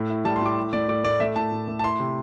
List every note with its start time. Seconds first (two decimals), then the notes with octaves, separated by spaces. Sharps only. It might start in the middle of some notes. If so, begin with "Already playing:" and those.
Already playing: A2 A3
0.10 E4
0.25 G3 A5
0.36 C6
0.42 A2 D6
0.56 E4
0.73 A3 D5
0.88 A2 D5
1.04 A2 D5
1.20 A3 E5
1.36 A2 A5
1.52 A2
1.68 A3
1.79 A5
1.84 E4 C6
1.99 C3